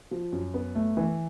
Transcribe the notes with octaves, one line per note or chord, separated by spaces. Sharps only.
F3
F#2
B3
A3
E3